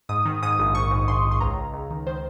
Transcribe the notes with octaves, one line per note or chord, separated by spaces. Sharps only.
G#2 D#6
D#3
G#2 D#6
A#1
A#1 C#6
G#2
A#1 C6
A#1
C6
C#2 A#5
C#2
C#2
D#3
D#3 C5